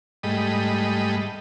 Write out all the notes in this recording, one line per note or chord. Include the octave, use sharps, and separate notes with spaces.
G#2 G3 A3 D#5 B5